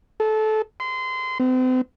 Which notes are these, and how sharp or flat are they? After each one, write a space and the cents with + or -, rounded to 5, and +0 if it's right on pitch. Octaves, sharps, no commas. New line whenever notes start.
A4 -20
C6 -25
C4 -40